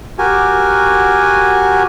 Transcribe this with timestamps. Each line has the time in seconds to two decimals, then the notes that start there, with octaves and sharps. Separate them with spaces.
0.18 F#4 G4 A#4 G#5